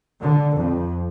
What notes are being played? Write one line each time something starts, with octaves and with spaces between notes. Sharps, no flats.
D3
F2